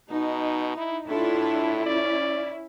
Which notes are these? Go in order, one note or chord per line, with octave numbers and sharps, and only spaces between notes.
B2 D#4
E4
A2 D4 E4 F4 A4
C#4 D5